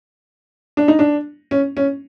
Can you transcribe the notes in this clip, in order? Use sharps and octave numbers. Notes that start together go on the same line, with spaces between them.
D4
D#4
D4
C#4
C#4